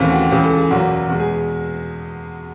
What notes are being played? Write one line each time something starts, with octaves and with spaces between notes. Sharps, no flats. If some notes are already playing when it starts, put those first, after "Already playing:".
Already playing: D#2 C#3 E3 A3 C4
F#4
C#2 C#3 E3 G4
A4
G#4
F#1 E2 B2 F#3 A#3 F#4
E2 B2 G#3 F#4
G#4